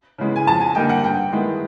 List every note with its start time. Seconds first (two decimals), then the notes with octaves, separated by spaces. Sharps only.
0.18 C#3 E3 G#3 B3
0.36 G#5
0.47 F2 A5
0.61 G#5
0.75 D3 G3 A#3 D#4 G5
0.89 F#5
1.04 G2 G5
1.32 D#3 G#3 B3 E4